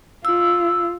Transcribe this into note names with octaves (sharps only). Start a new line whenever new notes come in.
F4 E6